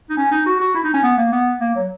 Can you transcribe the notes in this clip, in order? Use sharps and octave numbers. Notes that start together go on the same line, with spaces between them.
D#4
C#4
D#4
F#4
F#4
E4
D#4
C#4
B3
A#3
B3
A#3
F#3